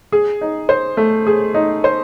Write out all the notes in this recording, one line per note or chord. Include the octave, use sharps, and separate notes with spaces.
G#4
D#4
C5
A3
G#4
D#4
C5